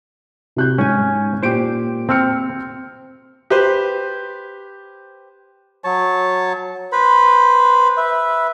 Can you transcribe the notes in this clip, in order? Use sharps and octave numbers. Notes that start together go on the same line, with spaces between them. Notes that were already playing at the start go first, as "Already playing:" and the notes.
C3 F#6 G6
G#2 C#4 G#5
A#2 G4 C5 D7
C4 E6 F6 C#7
G4 B4 C5
F#3 C#5 A5
B4 C5 B5
B4 E5